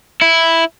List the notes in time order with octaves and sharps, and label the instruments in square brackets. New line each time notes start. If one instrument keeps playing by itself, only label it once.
[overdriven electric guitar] E4